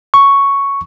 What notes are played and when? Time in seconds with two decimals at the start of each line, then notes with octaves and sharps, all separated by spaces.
0.14 C#6